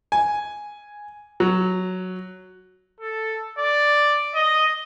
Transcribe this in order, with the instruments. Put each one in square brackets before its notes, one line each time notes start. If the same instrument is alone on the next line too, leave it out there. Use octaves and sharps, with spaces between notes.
[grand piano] G#5
F#3
[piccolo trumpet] A4
D5
D#5